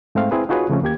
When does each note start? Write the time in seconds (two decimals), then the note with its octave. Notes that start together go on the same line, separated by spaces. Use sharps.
0.15 G#2 A3 C4 F5
0.31 C4 E4 G#4 B4
0.49 D#4 F4 F#4 G#4 B4 C#5
0.70 C#3 F3 A3 C4 C#4
0.82 D#2 A#3 G4 G#6